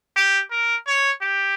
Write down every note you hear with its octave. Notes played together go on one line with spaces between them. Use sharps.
G4
A#4
C#5
G4